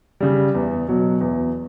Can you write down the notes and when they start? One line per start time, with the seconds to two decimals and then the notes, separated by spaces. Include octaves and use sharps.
0.20 C#3 G3
0.54 E2
0.88 B2 F#3
1.21 E2